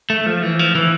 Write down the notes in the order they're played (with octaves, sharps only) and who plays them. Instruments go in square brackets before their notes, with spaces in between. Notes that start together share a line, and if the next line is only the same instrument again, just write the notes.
[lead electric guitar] A3
F3
E3
F3
E3